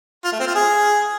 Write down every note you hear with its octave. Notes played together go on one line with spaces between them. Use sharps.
F4
A3
C4
F4
G#4